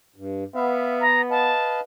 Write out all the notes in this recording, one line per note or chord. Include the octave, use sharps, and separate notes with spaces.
G2
B3 E5 F5
A#5
B4 D#5 F5 A5